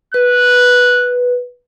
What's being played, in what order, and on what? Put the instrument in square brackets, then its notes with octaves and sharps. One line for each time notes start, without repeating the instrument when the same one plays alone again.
[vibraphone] B4 [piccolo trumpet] F#6